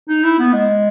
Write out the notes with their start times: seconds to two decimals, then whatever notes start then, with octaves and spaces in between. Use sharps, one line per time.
0.09 D#4
0.24 E4
0.39 B3
0.53 G#3